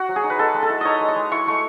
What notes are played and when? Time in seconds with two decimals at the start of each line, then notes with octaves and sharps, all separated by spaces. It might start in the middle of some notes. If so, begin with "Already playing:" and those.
Already playing: F#4
0.09 F#3
0.16 G#4
0.24 D#4
0.30 B4
0.39 G#3 A4
0.54 G#3
0.63 A4
0.70 E4
0.81 D#4 C#5 D#5
1.01 G#3
1.08 D#5
1.16 G#3
1.31 E4 C#6
1.47 A3 C#6